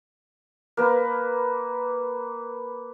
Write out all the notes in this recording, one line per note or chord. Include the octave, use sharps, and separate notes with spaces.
A#3 B4